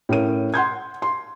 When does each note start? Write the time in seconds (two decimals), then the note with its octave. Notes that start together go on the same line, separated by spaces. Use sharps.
0.09 A2 C#4 A#4 D#7
0.54 F#5 C6 G6 G#6
1.02 C6